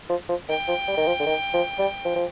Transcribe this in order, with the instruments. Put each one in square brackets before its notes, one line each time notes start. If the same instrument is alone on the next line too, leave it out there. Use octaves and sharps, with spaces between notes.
[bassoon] F3
F3
[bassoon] D#3 [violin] G5
[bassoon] F3
G3
D#3
F3
D3
D#3
F3
G3
F3
F3